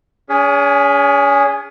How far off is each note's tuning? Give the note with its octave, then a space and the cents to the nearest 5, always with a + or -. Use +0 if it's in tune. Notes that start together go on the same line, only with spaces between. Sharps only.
C#4 +40 G#4 -5